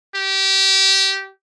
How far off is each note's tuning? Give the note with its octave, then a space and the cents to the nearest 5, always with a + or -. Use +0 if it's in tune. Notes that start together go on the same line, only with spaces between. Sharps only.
G4 -20